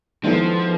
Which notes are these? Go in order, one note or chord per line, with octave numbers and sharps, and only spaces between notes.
D#3 F3 G#3 B3 E4 A4